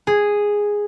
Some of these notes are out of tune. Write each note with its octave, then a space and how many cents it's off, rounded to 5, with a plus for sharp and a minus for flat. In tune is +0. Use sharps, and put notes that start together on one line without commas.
G#4 -5